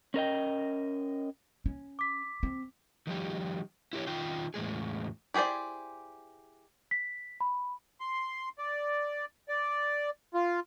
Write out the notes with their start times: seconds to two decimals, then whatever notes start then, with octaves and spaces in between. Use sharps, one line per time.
0.14 C#4 A#4 D#5 G5
1.66 C#4
1.99 D6 B6
2.43 C4
3.07 D#3 F3 G3 G4
3.93 E4 G4 B4 C#5
4.07 D#3 D#4 F4 G5
4.54 E2 A2 G#3 G#4
5.34 E4 G4 G#4 C5 D5
6.91 B6
7.41 B5
8.00 C6
8.58 D5
9.49 D5
10.34 F4